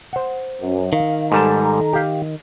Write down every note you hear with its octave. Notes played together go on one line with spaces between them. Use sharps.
C5 F#5
F#2
D#3 F5
G#2 G3 A4 A5 A#5
G4 F5